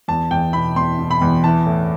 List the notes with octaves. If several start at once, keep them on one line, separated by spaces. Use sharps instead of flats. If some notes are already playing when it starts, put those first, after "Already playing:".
E2 A5
E2 G5
B2 B5
E2 C6
B2
B5
E2
E3 A5
A2